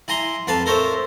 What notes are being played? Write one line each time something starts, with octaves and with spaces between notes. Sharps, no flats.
E4 G#5 A#5 C6
F2 B4 F5 A5
A4 A#4 C5 C#5 E5